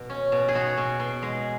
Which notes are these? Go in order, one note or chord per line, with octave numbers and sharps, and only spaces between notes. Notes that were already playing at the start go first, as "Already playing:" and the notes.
Already playing: B2
C#4
B2
G#4
B2 F#4
B2
B2
G#3